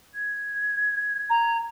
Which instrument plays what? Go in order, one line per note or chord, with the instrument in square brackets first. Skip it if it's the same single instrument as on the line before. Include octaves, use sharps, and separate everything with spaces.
[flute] G#6
[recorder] A#5